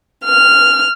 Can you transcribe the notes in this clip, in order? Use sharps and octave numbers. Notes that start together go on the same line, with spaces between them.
F6